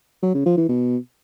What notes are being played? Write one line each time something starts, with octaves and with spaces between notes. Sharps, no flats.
F#3
C#3
F3
E3
B2